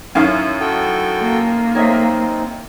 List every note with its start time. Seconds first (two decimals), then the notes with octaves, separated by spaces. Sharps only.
0.15 F#2 D#3 C#4 E4 F5
0.60 F#4 A4 G5
1.22 A#3
1.75 C4 D#4 C#5 D#5 E5